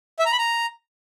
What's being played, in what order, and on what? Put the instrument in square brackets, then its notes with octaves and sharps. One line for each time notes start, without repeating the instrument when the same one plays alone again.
[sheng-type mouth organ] E5
A#5
B5
A#5